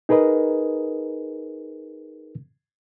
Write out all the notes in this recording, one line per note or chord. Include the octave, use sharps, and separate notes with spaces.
D#4 G#4 A#4 B4 D#5